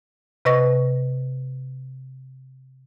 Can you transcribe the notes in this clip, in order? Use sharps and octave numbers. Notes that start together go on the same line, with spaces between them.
C3 B4 D#5 C#6 A#6